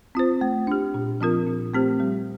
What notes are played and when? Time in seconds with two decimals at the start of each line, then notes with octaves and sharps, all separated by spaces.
0.15 C4 F4 C5
0.41 A3
0.67 D4 G4
0.94 A#2
1.21 F3 C4 F4 A#4
1.47 A#2
1.74 A3 C4 G4 C5
2.00 G3